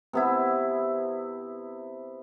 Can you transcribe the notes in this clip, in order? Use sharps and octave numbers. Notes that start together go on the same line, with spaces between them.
C3 B3 E4